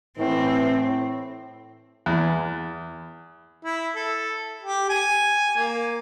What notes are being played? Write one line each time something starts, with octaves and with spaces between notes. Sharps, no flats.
A2 E3 C4
E2
E4
A4
G4
G#5
A#3